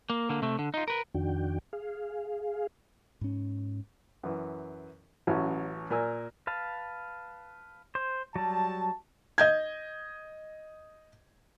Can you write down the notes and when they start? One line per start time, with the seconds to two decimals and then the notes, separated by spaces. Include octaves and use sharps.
0.10 A#3
0.29 D3 A#3
0.42 C3 A3
0.59 D3
0.74 D#4 F4
0.88 A#4 B4
1.14 F2 D#3 D4 F#4 G5
1.73 G#4 F5
3.21 G#2 C#4
4.23 F#2 E3
5.27 A1 E3 F#3 C#4 E4 F#4
5.90 A#2 A#4 G#5 E6
6.47 B4 F5 A5
7.95 C5
8.36 F#3 G3 A5
9.38 D#5 G6 G#6